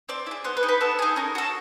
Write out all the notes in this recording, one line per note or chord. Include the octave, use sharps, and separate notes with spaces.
C4 D5
E4
G#4
B3 C5
B4
D#4 G#4
B4
B3 A4
D#4 G#4
C#4 A#4
F#4 A4